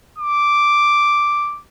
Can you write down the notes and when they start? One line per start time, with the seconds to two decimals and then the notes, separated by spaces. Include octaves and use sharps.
0.18 D6